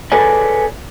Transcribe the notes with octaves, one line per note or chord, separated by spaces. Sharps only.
G#4 A4 B4 C#5 D5 G#5